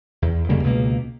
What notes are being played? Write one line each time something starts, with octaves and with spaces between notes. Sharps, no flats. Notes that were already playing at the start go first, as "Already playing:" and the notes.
E2
F2 C#3 G3 A#3
C#2 B2 A#3